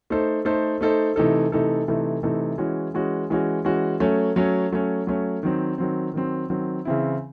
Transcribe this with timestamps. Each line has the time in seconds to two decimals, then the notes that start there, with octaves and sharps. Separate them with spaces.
0.10 A3 D#4 A4 C5
0.45 A3 D#4 A4 C5
0.81 A3 D#4 A4 C5
1.16 C3 E3 A3 D#4 A4
1.52 C3 E3 A3 D#4 A4
1.88 C3 E3 A3 D#4 A4
2.23 C3 E3 A3 D#4 A4
2.58 E3 G#3 C#4 F#4
2.94 E3 G#3 C#4 F#4
3.30 E3 G#3 C#4 F#4
3.65 E3 G#3 C#4 F#4
4.00 F#3 A3 C#4
4.36 F#3 A3 C#4
4.72 F#3 A3 C#4
5.07 F#3 A3 C#4
5.43 D#3 F#3 C4
5.78 D#3 F#3 C4
6.14 D#3 F#3 C4
6.50 D#3 F#3 C4
6.85 C#3 E3 C4 E4